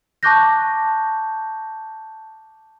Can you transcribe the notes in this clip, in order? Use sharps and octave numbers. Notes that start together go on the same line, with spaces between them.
A5 C#6 D6 F#6 G6 A#6